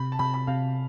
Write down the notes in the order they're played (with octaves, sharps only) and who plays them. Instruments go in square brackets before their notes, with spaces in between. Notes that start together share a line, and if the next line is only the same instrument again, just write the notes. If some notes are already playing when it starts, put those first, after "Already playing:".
Already playing: [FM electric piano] C3 [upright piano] B5
[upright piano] A5
[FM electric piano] C3 [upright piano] B5
[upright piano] B5
[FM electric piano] C3 [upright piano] F5